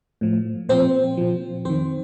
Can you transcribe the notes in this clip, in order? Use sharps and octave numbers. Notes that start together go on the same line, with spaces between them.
A2 F3
A#2 F3 C4 C5
A#2 F3
F2 D#3 C4 C5